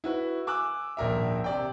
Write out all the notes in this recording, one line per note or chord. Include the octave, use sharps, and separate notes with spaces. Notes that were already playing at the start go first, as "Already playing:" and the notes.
E4 F#4 B4
G#5 D6 E6 F#6
D#1 A#1 A#4 E5
C3 D5 G5